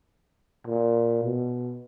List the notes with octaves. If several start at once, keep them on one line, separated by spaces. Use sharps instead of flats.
A#2
B2